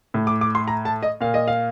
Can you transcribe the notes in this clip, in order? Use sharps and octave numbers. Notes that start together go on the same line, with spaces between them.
A2
D6
D6
C6
A#5
A5
D#5
A#2 F5
D#5
F5